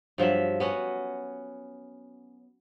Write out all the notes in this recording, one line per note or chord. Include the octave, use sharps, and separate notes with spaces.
G2 F3 F#3 E5
B3 C#4 F#4